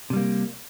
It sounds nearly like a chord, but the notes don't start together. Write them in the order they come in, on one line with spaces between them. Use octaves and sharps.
C3 G3 A#3